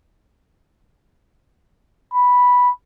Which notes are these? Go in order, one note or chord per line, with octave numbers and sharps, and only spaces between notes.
B5